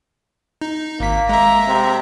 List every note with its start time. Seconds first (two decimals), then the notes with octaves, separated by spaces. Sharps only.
0.61 D#4
1.00 G#1 A#3 B6
1.29 G#3 E5 A#5
1.68 C3